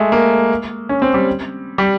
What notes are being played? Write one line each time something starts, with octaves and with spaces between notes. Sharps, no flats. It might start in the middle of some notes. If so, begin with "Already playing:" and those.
Already playing: G#3 A3
A#3
C#4
C4
G3
G3